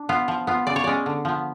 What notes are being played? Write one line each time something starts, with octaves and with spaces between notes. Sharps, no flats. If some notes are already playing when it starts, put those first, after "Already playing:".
Already playing: D4
B3 F4
F3
B3 F4
C#3 D5
C#5
G#3 C#4 D5
D3
F3 B3